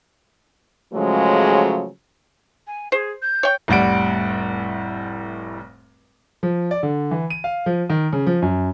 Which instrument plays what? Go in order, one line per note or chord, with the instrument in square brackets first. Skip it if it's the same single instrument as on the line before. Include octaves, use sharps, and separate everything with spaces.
[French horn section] C#3 F3 F#3 G#3 A3
[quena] G#5
[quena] G#4 [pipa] C5
[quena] G6
[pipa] C#5 G5
[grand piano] F1 A2 G3 F#5 D7
F3
D5
D3
E3
D#7
F5
F3
D#3
C#3
F3
F#2